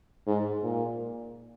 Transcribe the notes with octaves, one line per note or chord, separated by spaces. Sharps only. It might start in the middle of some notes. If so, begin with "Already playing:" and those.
G#2
A#2